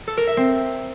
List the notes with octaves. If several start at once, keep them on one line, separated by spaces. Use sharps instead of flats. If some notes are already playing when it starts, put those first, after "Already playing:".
A4
A#4
E5
C4